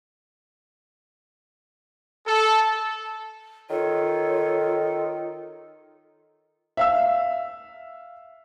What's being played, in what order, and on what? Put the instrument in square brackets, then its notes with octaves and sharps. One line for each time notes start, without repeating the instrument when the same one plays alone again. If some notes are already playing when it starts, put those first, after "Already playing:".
[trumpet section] A4
[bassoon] D#3 [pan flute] F4 [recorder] A4 [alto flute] C#5
[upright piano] E5 F5 E6